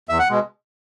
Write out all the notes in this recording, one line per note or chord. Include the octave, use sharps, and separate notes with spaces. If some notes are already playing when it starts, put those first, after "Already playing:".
E2 E5
F#5
B2 G#3